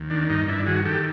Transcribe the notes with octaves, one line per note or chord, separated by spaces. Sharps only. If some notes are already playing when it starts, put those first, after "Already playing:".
Already playing: D#2
D#3 D4
G2 D#4
G2 D4 E4
D#3 F#4 G#4
D#3 G4 A4